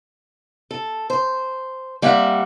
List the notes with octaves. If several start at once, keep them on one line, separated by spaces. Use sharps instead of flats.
A4
C5
G3 A#3 C4 E5 F#5